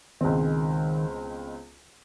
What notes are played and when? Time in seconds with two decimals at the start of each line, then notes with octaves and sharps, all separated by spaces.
0.21 C#2 B2 D#3 G#3 C4